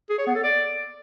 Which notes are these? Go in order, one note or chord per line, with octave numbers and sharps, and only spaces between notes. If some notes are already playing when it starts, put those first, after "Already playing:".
G#4
C#5
B3
A4
D5